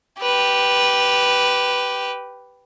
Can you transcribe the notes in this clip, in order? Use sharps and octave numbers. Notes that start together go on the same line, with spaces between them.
G4 B4